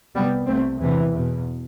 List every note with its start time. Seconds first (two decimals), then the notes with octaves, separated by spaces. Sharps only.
0.15 C2 C3 G3 B3
0.47 C2 C3 A3 C4
0.79 E2 C3 E3
1.12 E2 B2